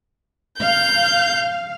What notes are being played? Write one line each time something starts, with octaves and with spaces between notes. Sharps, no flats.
F5 G6